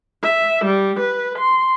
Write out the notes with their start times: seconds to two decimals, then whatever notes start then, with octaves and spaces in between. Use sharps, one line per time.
0.23 E5
0.65 G3
1.00 B4
1.39 C6